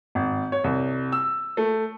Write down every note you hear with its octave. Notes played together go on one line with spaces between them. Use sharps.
G#1
C#5
C2
E6
A3